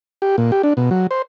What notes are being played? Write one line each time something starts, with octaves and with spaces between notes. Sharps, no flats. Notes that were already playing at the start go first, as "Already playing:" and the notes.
G4
A#2
G4
D4
B2
F#3
C5